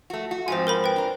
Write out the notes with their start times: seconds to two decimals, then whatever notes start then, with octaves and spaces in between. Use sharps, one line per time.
0.10 A3 F#4
0.31 F#4
0.48 G#2 F3 C4 C5 G#5
0.67 A#4 C5 B5
0.84 B4 G5
0.96 D4 A#4